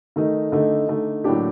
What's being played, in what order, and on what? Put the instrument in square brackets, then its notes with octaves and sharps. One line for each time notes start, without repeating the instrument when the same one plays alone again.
[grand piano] D#3 A3 D#4
D3 A3 D#4
D3 A3 D#4
A2 F#3 A#3 D4 G4